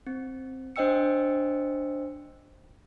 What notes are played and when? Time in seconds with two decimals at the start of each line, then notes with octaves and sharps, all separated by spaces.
0.07 C4
0.76 D4 C5 D#5 G5 E6 C#7